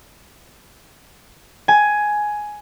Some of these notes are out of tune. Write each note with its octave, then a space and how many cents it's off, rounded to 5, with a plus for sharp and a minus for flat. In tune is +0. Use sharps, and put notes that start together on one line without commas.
G#5 +10